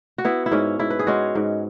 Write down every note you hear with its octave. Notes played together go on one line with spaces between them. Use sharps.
F#4
B3 E4
E4
G#2 C#4
G#2 E4
B4
G#4
G#3 C#4 F#4
G#2